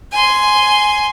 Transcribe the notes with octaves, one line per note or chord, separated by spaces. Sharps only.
G#5 C6